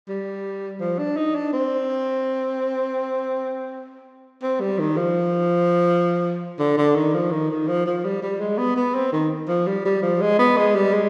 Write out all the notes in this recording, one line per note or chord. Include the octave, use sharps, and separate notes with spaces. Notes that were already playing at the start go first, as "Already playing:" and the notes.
G3
F3
D4
D#4
D4
C4
C4
G3
D#3
F3
D3
D3
D#3
F3
D#3
D#3
F3
F3
G3
G3
G#3
B3
B3
C4
D#3
F3
G3
G3
F3
G#3
B3
G#3
G3
G#3